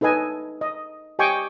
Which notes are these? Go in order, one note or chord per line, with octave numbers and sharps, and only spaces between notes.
D#4 A4 B4 D#5 G#5
D#5
G4 D#5 G5 G#5 C#6 D6